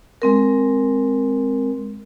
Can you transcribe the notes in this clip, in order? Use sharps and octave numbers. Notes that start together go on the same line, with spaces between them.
G#3 C4 A#4